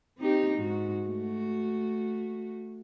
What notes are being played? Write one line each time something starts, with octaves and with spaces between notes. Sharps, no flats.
C4 D#4 G4
G#2 F#4
A3 F#4